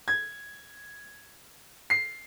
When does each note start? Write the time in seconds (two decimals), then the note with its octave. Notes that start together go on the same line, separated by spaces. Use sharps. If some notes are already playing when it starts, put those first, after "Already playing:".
0.08 G#6
1.90 C7